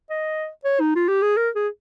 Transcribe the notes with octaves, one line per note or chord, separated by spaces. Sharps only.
D#5
C#5
D#4
F4
G4
G#4
A#4
G#4